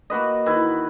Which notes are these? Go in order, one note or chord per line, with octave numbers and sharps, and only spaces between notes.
A#3 F#4 B4 D#5
D#3 E4 B4